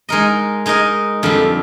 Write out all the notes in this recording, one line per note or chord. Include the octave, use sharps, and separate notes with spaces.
G#3 D#4 A#4 D#5
G#3 D#4 A#4 D#5
F2 D3 G3